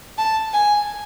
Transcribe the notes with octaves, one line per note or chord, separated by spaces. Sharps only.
A5
G#5